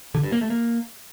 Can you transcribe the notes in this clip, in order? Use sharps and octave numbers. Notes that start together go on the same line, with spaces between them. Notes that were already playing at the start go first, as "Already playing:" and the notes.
D3
G2
A#3
A3
A#3